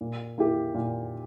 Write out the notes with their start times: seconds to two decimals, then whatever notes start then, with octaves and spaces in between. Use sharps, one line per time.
0.01 A#2
0.38 A#3 E4 G4
0.75 A#2